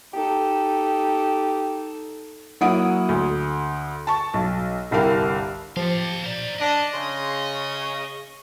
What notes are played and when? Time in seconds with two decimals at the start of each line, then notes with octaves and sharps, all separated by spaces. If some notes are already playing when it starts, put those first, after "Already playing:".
0.14 D#4 G4 A4
2.61 F#3 A#3 E4 F#5 D#6 D7
3.09 D2
4.07 A5 C#6
4.34 B1
4.91 G1 C2 E4 G4 A#4 F5
5.77 F3 G4 A4 F5
6.24 C5 D5 A#5
6.59 D4 D#5
6.92 C#3 C6
7.54 C#6